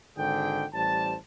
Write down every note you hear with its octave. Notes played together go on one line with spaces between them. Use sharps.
G#1 G#2 D3 G#4 G5
A1 G3 C5 A5